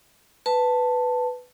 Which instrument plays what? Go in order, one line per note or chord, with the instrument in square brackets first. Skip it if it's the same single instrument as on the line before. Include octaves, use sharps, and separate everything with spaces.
[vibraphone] B4 A5